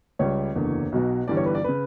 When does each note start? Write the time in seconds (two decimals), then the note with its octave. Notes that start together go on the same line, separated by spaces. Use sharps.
0.19 C#2 C#3 G3 C#5
0.55 F#1 E2 D3
0.92 B1 B2 F#3
1.28 G1 G2 E3 G3 D5
1.37 C#5
1.46 B4
1.55 D5
1.64 C#3 B4